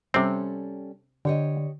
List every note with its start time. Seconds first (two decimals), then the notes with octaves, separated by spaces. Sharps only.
0.14 C3 G3 C4 C#4 A4
1.25 D3 G4 C#5 D#5